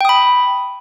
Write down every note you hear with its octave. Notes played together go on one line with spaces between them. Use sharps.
G5 B5 D#6